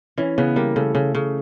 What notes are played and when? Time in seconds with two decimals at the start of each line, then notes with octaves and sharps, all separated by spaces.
0.18 E3 C#4
0.38 C#3 B3
0.56 G3 A#3
0.76 C#3 A3
0.95 C#3
1.15 C#3